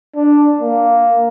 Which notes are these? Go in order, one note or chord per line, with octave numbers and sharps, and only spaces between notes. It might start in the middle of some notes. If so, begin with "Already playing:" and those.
D4
A#3